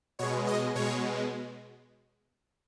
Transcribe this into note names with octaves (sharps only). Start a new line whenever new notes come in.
B2 G#3 C#5
D#5
B2 G#3 C#5